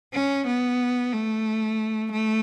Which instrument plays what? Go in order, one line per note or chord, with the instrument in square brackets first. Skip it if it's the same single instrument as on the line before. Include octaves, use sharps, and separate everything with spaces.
[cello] C#4
B3
A3
A3